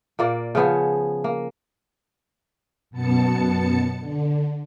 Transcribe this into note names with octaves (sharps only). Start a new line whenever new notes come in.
A#2 A#3 D5
C#3 F3 B3 G#4
A#3
F#2 B2 B3 A5 C#7
D3